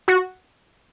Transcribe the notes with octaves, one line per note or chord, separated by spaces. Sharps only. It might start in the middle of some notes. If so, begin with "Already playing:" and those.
F#4